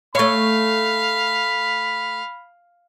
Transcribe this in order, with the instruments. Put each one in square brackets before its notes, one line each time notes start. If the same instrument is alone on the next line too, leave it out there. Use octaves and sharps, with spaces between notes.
[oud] A3 C#5 [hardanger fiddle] F5 [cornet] B5